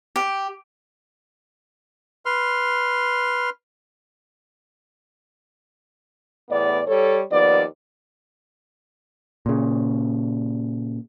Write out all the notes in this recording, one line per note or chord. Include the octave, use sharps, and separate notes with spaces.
G4
B4 C6 F6
E2 A2 B3 D5
G3 A4 C#5
D#2 F3 B3 D5
A#2 C#3